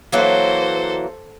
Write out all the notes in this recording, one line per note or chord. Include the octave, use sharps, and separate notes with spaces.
E3 F#3 A#3 A4 C5